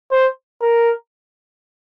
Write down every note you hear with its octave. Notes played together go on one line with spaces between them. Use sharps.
C5
A#4